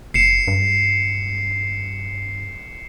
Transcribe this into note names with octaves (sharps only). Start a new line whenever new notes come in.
F#1 C7 C#7 E7
G2